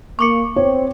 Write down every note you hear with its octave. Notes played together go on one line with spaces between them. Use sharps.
A#3 C#6 D6 C#7
C4 C#5